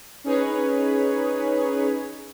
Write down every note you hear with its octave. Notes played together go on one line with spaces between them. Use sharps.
C#4 D#4 G#4 B4 C#5